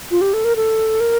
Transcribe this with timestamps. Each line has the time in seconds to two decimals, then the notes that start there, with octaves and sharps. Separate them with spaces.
0.11 F4
0.21 G4
0.34 A4
0.44 A#4
0.56 A4
1.00 A#4